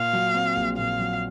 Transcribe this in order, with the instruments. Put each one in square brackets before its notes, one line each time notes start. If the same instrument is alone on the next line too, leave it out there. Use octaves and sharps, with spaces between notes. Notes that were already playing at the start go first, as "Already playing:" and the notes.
Already playing: [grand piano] A#2 [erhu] F5
[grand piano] F#3
C4
A#1
[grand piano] A#2 [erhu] F5
[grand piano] F#3